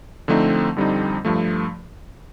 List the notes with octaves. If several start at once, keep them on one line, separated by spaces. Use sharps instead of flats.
D3 F3 A3 C4 D#4
F2 D3 G3 C4 D#4
G2 F3 A3